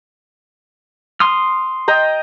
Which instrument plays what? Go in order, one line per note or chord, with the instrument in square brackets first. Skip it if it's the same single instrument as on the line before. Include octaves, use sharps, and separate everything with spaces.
[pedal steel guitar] C6 D#6 F6
[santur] D#5 G5 A#5